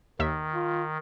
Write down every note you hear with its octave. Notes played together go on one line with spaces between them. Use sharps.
D#2 D#3 E5 E6
F4